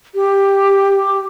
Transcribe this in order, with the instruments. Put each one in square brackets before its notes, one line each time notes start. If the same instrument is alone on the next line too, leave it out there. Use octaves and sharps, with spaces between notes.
[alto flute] G4